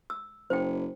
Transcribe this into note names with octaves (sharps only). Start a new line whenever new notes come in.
E6
F#1 C5 G5